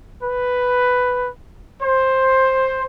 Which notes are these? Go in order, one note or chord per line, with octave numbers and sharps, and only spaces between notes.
B4
C5